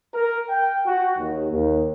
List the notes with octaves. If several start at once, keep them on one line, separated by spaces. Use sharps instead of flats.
A#4
G5
F#4
D#2
D#2